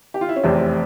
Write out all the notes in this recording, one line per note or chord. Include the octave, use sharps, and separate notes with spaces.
G4
F4
E4
C#4
F1 E2 C3 C4